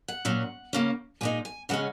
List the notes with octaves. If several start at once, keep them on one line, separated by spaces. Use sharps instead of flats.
F#5
A#2 F#3 C#4
C#3 A#3 C#4
A#2 G#3 D#4 G#5
G#5
C#3 G#3 C#4 F#5